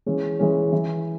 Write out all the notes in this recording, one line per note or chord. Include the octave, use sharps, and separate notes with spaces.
E3 G#3 C#4
E3 G#3 C#4
E3